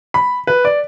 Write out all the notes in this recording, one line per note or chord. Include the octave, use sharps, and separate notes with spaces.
B5
B4
D5